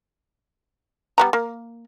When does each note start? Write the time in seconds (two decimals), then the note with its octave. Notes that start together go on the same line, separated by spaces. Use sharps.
1.18 G3 B3 A#5
1.33 A#3